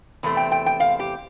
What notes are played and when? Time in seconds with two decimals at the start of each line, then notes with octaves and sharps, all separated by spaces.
0.23 E2 C3 A3 C4
0.37 G5
0.52 G5
0.66 G5
0.80 F5
0.99 G4